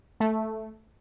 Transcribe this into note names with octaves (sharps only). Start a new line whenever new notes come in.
A3